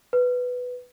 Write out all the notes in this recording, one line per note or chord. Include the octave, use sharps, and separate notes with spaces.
B4